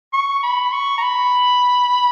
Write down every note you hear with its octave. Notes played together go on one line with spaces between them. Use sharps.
C#6
B5
C#6
A#5
B5